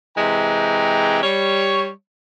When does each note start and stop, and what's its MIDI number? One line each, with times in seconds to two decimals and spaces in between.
0.16 1.22 48
0.16 1.22 52
0.16 1.22 56
0.16 1.22 79
0.16 1.22 82
1.22 1.89 55
1.22 1.89 73